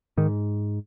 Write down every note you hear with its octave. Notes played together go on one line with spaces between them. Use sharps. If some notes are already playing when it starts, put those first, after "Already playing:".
G#2 D#3